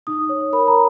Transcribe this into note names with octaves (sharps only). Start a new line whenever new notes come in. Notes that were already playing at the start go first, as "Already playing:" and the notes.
D#4 D#6
C#5
A#4 B5
A#5